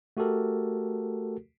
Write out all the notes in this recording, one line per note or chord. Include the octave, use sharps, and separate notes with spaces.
A3 F#4 G4 A4 A#4